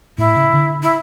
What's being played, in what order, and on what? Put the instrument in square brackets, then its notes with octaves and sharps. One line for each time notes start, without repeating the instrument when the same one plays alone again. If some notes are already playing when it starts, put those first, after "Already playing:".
[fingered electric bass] A2 [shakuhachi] E4
[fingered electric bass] C#3
D3
[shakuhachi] E4